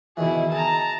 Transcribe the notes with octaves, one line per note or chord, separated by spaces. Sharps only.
B2 D#3 E3 E4 G#4
G#4 A5 A#5